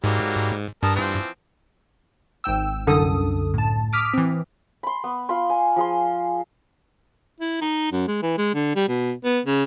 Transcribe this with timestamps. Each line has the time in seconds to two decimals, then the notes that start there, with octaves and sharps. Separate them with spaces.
0.04 G#2 F#3 G3 A#3
0.83 G2 A#4 A5 D#6
0.96 E3 F3 C4
2.44 G#1 G#2 G5 E6
2.87 C2 F#2 D3 A4 D#6
3.54 A2 A5
3.93 D6 D#6 F6 B6
4.14 E3 C4
4.83 B5 C6
5.04 B3
5.29 F4 B5 C6
5.50 G#5
5.76 F3 G#4 C6
7.40 E4
7.61 D#4
7.92 F#2
8.08 G#3
8.22 E3
8.38 G#3
8.54 D3
8.75 G3
8.88 B2
9.24 B3
9.46 C#3